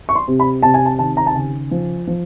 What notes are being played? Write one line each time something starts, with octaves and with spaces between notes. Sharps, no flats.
C#6
C6
C3
B5
C3 A5
G#5
A5
D#3 A5
A#5
A5
C#3 G#5
F3
F3